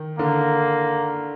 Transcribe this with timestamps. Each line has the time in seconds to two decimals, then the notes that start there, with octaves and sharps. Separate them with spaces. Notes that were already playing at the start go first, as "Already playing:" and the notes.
Already playing: D#3
0.19 D3 A#3